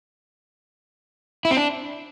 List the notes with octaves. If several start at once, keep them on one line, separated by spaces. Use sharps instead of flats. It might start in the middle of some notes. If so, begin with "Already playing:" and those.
E4
C4
D4